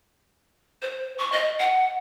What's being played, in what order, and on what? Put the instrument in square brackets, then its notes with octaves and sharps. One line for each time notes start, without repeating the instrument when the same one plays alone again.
[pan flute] C5
C#6
D#5
F#5